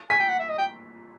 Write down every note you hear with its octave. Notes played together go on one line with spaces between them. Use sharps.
G#5 B6
G5
F#5
E5
D#5
G5